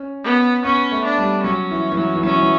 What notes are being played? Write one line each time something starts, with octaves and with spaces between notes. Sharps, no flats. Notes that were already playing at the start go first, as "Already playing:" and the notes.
Already playing: C#4
B3
B3 C#4
A3
D4
G3
F#3 C#4
E3
E3
F#3
E3
F#3 C#4
E3
F#3